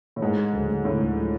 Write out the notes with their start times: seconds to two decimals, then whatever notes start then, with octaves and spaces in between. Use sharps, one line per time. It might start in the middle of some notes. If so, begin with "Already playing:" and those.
0.16 A2
0.22 G#2 G#3
0.37 G#3
0.53 D2
0.68 D2
0.84 A2 D3
1.00 D2
1.16 F3